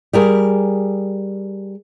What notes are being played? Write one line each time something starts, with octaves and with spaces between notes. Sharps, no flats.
G3 G#4 A#4